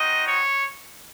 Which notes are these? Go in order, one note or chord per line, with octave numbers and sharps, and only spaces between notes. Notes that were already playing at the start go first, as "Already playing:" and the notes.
Already playing: C4 D#4 F#4 D#5
C#5